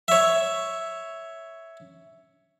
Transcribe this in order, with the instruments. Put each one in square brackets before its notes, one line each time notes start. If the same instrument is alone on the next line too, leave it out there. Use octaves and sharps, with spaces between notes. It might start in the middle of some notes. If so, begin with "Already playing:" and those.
[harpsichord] C#5 E5